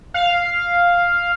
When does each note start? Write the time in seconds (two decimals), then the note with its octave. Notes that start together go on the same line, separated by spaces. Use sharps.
0.14 F5